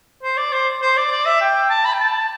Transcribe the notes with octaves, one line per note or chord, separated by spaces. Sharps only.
C5
D5
C5
C5
D5
D5
E5
G5
A5
B5
G5
A5